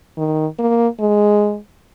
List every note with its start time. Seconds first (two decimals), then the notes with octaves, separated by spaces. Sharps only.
0.18 D#3
0.59 A#3
1.00 G#3